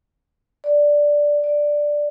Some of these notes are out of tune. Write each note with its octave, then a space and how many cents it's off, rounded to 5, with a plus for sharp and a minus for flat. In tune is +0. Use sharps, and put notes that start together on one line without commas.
D5 +0
D5 +5